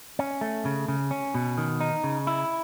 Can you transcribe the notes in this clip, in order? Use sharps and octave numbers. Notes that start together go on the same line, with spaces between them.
C#4
A3
C#3
C#3
C#4
B2
D#3
D#4
C#3
E4